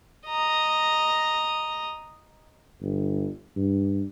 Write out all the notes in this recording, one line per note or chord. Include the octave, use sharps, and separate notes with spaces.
D#5 A#5
G1
G2